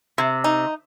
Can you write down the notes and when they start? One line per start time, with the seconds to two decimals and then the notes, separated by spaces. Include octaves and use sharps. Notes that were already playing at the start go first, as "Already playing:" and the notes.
0.18 C3
0.44 D#4